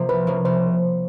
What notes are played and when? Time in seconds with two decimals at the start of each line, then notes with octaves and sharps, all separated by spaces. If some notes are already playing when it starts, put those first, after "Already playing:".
Already playing: C3 F3 A#3 C5
0.09 C2 B4
0.27 C3 F3 A#3 C#4
0.45 C2 C5